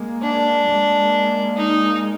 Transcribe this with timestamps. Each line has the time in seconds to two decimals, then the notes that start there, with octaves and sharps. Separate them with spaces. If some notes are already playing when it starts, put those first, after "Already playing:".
Already playing: G#3 A#3
0.23 D4
0.67 G#3 A#3
1.57 D#4